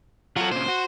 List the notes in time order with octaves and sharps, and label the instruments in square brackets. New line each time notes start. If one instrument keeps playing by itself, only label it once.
[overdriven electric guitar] F#3 F#4 [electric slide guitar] F4 A4
[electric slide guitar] A#2 C#3 [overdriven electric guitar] C5
[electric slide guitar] F#4